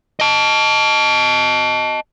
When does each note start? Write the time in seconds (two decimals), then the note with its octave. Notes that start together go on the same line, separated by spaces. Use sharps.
0.20 D#5 A5